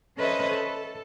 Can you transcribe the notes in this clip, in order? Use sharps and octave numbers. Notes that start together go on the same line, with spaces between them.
C#4 A4 B4 C5 D#5 E5
A4